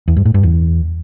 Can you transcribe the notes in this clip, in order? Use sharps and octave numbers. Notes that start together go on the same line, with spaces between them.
E2
G2
A2
G2
E2